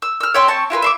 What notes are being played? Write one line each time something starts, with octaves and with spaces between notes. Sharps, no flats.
E6
E6 F6
C#5 E5 G5 C6
C4 A5 C#6
E4 F4 G4 B4
E5 C6 D6